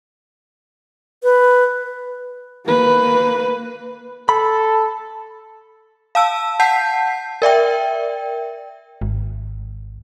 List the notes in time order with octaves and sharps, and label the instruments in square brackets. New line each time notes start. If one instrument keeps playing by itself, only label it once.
[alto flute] B4
[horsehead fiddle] A#3 B4
[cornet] A4 [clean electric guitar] B5
[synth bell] F5 A5 E6
F#5 A5 G6 B6 C7
A#4 D5 E5 G5
[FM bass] G#1